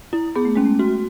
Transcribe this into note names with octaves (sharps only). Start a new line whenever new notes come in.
E4
B3 G#4
A3
G#3 C#4
A3
F#4